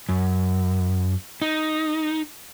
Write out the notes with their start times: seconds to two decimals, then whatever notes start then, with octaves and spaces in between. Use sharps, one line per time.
0.09 F#2
1.42 D#4